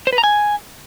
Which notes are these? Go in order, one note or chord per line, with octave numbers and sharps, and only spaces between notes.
C5
B4
A#5
G#5